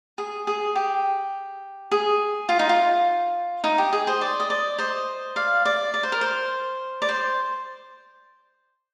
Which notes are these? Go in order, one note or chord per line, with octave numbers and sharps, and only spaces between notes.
G#4
G#4
G4
G#4
F4
D#4
F4
D#4
G4
G#4
C5 D#5
D5
D#5
D5
C5 D#5
D5 F5
D5
D5
C5
A#4
C5
D5
C5